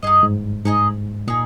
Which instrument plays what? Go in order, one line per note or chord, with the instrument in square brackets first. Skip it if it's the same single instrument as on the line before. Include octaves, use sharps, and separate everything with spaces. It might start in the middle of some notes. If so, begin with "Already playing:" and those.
[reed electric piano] G2 [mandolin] D#4 G#4 D#5
[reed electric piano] G#2
[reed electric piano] G#2 [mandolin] D#4 G#4 D#5
[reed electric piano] A#2 [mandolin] D#4 G#4